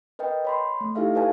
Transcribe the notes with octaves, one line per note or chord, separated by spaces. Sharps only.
A#4 B4 D#5 G5
C#5 B5 C6
A3
D#4 E4 G4 A4 E5 F5
A4 B4 C#5 F5 G#5 A5